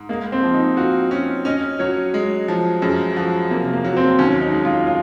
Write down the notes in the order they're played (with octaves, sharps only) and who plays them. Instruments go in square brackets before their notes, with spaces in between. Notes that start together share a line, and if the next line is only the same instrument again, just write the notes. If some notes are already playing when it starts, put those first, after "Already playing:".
Already playing: [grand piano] G#2
[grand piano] G#3 [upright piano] A#3
[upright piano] C4
[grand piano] F3
[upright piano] D#4
[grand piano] F4 [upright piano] F#4
[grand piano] C#4 [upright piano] F#4
[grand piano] C#4 [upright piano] D#5
[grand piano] F#3 [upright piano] C#5
[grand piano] G#3
F3
[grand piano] F#2 [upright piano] G#4
[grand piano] F3 [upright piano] F#4
[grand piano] C3 [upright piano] A#3
[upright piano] A#3
[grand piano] F#3
[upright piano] C4
[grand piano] D#2 [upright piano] C#4
[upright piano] D#4
[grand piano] G#3
[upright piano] F4
F4